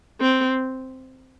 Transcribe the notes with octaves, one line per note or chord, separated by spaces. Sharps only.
C4